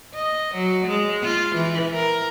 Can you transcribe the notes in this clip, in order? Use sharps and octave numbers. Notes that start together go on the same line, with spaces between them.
D#5
F#3
G#3
F4
E3
A#4